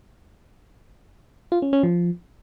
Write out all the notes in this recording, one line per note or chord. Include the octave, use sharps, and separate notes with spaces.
F4
C#4
C#4
F3